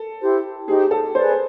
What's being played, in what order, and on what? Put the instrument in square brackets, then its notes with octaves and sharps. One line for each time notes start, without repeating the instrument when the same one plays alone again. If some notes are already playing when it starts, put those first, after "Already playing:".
Already playing: [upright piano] A4
[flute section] E4 G4 C5
[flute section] D#4 G4 C5 [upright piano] G#4
[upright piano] A4
[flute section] G#4 B4 D5 [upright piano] C5